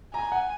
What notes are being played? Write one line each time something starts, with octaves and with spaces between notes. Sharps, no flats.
G#5 A#5
F#5